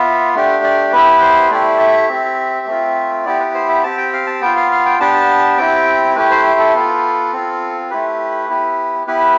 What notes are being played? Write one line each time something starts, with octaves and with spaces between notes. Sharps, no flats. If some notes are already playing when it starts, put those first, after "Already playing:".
Already playing: B3 F4 E5
A3 D4 G4
D5
B3 E4 G4 B4
C5
A3 E4 G4 D5
E5
C4 G4
A3 C4 F4
B3 E4 G4 D5
B4
C5
E5
C4 G4 A5
G5
F5
A5
B3 F4 G5
F5
F5
G5
B3 D4 G4 A5
C4 E4 G4 G5
A3 E4 G4 B4
C5
A4
B3 F4
C4 F4
A3 E4 G4 B4
B3 E4 G4
B3 E4 G4 B4